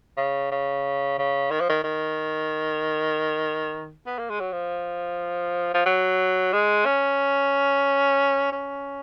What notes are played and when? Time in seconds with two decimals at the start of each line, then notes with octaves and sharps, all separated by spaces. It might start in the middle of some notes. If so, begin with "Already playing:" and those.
0.17 C#3
0.52 C#3
1.18 C#3
1.51 D#3
1.61 F3
1.70 D#3
1.84 D#3
4.07 B3
4.19 A#3
4.30 G#3
4.40 F#3
4.53 F3
5.74 F3
5.86 F#3
6.53 G#3
6.86 C#4
8.52 C#4